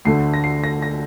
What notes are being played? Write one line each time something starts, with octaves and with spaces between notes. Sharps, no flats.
D2 D3 A3 C7
A#6
C7
A#6
A#6